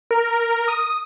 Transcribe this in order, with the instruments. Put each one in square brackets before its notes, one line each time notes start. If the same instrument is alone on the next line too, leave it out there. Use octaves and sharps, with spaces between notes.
[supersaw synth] A#4
D#6